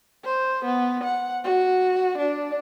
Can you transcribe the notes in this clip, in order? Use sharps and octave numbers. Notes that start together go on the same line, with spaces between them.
C5
B3
F#5
F#4
D4